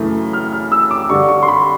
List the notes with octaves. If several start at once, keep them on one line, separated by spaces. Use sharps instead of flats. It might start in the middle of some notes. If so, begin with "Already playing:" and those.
Already playing: F#2 C#3 E3 A3
F6
F6
E6
D6
G2 D3 G3 C#6
C#6
C6
B5